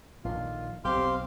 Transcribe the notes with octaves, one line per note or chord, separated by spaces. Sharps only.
A#1 D3 D#3 F4
B1 C4 G4 F5 C6